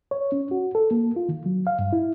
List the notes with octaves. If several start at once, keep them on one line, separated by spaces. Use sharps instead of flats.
C#5
C#4
F#4
A4
A#3
F4
D#3
F#3
F5
G2
E4